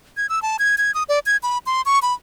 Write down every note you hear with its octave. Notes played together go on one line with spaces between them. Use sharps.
G#6
E6
A5
G#6
G#6
D#6
D5
G#6
B5
C6
C#6
B5